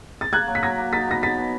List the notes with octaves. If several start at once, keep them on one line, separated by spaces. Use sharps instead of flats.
A6
A#3 F#6 G#6
F#3
B6
F#3 G#6 A#6
A#3
D#4 A6 B6
B2 A#6
B2 A6 B6
B2